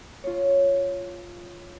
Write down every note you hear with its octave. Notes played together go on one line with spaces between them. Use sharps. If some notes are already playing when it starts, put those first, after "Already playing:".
F4 C#5